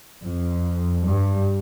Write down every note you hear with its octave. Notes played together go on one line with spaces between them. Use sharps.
F2
G2